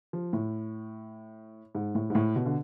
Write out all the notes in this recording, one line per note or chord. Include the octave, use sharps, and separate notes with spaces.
F3
A2
G#2
A2
G#2
A2
B2
D3